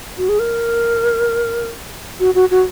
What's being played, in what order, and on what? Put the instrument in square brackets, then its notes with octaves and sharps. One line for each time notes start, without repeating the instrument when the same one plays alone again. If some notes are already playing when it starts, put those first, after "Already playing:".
[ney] F#4
G#4
A#4
F#4
F#4
F#4